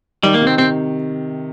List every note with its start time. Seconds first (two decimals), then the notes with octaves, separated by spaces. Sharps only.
0.23 D#3 G3
0.34 A#3
0.41 C3
0.47 C4
0.58 C3 C4